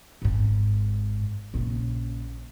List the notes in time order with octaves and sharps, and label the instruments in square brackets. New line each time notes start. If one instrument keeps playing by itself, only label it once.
[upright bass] G#1 G#2
A#1 C#3